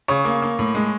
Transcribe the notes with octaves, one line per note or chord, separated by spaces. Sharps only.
C#3 C#5
A#3
A#3
A2
G#3